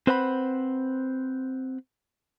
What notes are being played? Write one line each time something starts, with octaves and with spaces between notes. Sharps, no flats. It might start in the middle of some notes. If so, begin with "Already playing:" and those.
C4 B4 C5 F#5 A5 B5